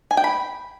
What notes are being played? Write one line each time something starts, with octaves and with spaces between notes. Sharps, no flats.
G#5
G5
B5